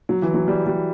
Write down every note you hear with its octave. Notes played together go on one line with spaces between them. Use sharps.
F#3
E3
F#3
G3
G3